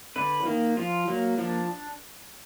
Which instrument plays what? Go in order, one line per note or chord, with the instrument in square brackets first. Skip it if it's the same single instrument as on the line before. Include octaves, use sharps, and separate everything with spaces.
[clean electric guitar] D3 [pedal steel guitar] B4
[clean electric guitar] F3
[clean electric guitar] D#3 [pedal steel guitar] A#3
[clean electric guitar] F3 [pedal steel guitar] F4
[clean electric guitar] F#3 [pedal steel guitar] A#3
[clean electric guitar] F3 [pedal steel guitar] D4